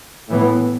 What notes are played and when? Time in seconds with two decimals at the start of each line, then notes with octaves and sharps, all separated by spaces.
0.29 A2 E3 B3